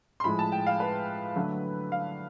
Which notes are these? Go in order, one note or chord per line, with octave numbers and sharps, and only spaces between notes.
C6
A2 F3 G#3 B5
A5
G5
F5
B4
D3 F#3 A3
F5